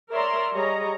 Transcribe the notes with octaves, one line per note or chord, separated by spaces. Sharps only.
A#4 C#5 D5 E5 A#5 C6
G3 G#4 C#5 D#5 A#5